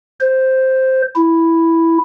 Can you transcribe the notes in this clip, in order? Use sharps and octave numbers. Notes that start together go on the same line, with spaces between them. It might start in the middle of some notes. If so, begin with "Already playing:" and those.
C5
E4